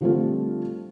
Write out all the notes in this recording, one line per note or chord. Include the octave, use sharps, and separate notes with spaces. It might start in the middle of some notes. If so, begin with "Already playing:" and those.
D3 F3 G3 A3 C4 F4